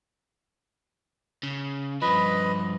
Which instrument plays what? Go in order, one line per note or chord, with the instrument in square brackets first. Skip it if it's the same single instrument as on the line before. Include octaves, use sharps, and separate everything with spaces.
[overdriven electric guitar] C#3
[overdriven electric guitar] G2 F3 [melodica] B4 D#5 B5